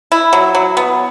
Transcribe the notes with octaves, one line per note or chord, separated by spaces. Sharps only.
E4
F#3
F#3
B3